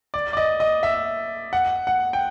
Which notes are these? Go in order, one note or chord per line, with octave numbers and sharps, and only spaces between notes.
D5
D5
D#5
D#5
E5
F#5
F#5
G5